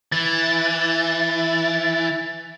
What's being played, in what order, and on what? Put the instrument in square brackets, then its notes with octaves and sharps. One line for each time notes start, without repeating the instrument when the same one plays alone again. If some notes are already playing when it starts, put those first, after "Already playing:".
[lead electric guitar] E3 [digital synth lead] A6